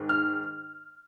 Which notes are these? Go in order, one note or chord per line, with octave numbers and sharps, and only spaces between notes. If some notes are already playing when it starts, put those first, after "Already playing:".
Already playing: G#2 D#3
F6